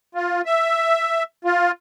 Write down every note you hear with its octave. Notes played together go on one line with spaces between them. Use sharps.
F4
E5
F4